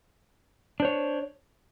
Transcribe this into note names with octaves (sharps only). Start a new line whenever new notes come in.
D4 C5 C#5